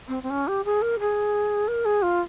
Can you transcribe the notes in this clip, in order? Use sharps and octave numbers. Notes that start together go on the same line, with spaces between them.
C4
C4
C#4
G4
G#4
A#4
G#4
A#4
G#4
F4